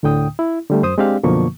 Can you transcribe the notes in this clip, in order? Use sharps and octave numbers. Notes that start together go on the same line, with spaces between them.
D2 A2 D3 G5 D#6
E4
D3 G3 A3
F#2 C5 D#6
G#3 C4 D4 G4 D5 F5
F#2 B2 D3 F3 A#3 C#6